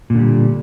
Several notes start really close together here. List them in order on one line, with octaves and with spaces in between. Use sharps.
A#2 D3 G3